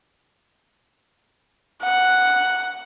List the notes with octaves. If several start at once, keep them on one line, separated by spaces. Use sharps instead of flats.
F#5